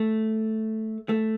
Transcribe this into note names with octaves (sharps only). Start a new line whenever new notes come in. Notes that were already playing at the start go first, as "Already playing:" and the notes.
Already playing: A3
A3